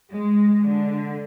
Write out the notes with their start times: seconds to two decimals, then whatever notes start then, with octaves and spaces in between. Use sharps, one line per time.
0.12 G#3
0.62 D3